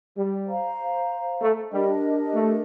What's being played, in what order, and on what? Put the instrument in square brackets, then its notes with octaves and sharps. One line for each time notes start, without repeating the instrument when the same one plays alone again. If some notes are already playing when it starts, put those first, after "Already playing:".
[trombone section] G3
[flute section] C5 F5 A#5
[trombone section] A3
[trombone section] G3 [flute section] D4 G4 A#4 D#5
[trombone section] A3